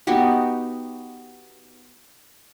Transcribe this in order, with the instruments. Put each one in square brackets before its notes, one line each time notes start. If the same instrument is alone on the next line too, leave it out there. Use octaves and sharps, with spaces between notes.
[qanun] B3 D#4 F#4 G4